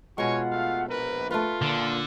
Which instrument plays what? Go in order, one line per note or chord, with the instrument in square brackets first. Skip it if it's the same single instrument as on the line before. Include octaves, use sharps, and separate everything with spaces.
[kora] B2 G#3 [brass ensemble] F4 F#5 [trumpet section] C#5 G#5 C#6
[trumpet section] A3 F5
[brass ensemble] A#1 [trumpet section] A#4 B4
[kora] A3 B4 [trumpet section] F4
[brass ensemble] A#2 [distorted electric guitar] D3